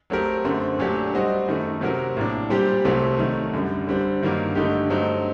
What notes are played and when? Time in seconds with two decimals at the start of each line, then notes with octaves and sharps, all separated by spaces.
0.10 F#3 A3 C4 G4 A#4
0.44 F#2 D3 A3 C4
0.79 A#2 F#3 A3 D4 G4
1.14 G3 C4 F#4 C5 D#5
1.48 F#2 D#3 A3
1.81 C3 F#3 C4 F#4 A#4
2.17 A2 F#3 A#3 D4
2.50 A#2 G3 C4 G4
2.85 C2 C3 F#3 A3 C4
3.19 D#3 F#3 A3
3.53 F#2 D3 G3
3.87 D3 G3 C4
4.22 G2 D#3 F#3 A#3
4.55 G2 D3 A3 D#4 G4
4.90 G2 F#3 A3 C4 D#4